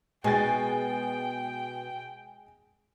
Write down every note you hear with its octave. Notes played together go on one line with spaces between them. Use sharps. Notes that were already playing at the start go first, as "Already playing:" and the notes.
B2 G#3 G5 G#5 A6